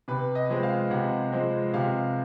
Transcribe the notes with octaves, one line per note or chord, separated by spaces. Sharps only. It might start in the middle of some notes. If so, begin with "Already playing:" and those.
C3 B4
D#5
F3 G#3 C4
F5
C3 F#5
F3 G#3 C4
C3 F5